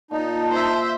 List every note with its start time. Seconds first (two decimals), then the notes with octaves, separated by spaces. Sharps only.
0.11 A#2 D#4 A5
0.51 C5 D#5 E5